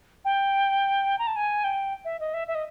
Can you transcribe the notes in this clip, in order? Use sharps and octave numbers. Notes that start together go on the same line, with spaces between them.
G5
A#5
A5
G#5
G5
E5
D#5
E5
E5
D#5